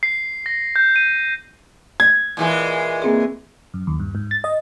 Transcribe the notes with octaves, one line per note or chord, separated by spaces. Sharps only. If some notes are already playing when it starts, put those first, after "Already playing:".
C7
A#6
G6
D#7
G#6
A#2 E3 G#3
A#3 C4 G#4
F#2
D#2
G2
G#2
A6
D#5